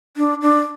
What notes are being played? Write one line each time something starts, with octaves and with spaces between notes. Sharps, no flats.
D4
D4